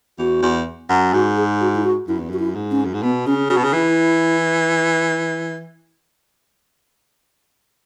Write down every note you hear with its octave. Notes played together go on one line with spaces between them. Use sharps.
E2 F#4
E2
F#2
G#2 F#4
G#4
F#4
E4
F#4
F#2 E4
E2
F#2 F#4
E4
G#2
C#4
F#2
G#2
B2 B3
C#3 C#4
C#3 F#4
B2
C#3
E3 E4